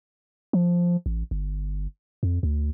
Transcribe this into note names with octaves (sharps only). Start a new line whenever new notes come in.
F3
A1
G1
F2
D2